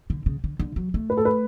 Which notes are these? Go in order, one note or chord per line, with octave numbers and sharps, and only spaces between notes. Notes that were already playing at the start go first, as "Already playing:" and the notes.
D3
C#3
D3
D3
F#3
A3
B4
A4
B4